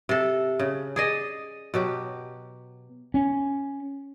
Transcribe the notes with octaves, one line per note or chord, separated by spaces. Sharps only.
C3 A4
C#3
G#4 D5 D#5
B2 F#3 G4
C#4